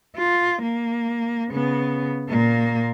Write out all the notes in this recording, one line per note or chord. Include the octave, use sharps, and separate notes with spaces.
F4
A#3
C#3 B3
A#2 A#3